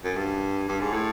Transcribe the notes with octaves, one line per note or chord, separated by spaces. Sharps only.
F#2
G2
G2
G#2
A2